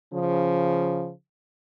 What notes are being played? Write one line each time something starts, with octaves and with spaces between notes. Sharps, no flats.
C#3 F3